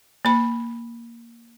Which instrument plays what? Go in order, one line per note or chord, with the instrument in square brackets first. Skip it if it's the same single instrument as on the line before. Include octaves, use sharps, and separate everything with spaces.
[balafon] A#3 B5